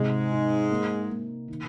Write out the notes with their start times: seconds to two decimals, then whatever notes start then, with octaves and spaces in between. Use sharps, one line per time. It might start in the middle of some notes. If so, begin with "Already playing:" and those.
Already playing: G#2 C3 G#3
0.32 D#4
0.71 A#3
1.10 A#3
1.48 D#3